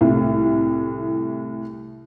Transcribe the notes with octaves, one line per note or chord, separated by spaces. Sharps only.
C2 A2